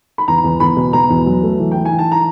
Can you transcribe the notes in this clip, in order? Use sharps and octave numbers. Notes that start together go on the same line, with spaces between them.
B5
E2 A#5
E2
E2 B5
B2
B2 A#5
E2
F#3
A3
E3
E3 G5
G#5
E3
A5
A#5